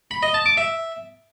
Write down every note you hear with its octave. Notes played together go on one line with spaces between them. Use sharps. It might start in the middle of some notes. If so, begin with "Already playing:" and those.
B5
D#5
A5
D6
E5